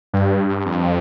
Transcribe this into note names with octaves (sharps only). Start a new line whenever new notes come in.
G2
F2